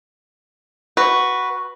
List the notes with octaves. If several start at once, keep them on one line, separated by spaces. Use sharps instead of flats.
F#4 B4